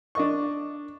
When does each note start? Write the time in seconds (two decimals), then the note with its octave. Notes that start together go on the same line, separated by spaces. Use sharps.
0.15 D4 D#5 C#6